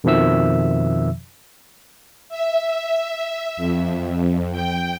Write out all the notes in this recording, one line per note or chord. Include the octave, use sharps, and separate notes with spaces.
F2 B2 D#3 F3 E5 E6
E5
F2
G5